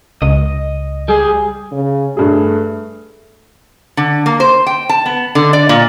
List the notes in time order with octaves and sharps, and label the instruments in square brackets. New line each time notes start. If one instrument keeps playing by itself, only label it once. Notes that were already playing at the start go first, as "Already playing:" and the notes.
[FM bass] C#2 [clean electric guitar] D#5
[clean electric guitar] G3 [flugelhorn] G#4
[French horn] C#3
[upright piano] G2 G#4 [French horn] A3
[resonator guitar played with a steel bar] D3
A#3
C5
G5
A5
B3
D3
D5
A#2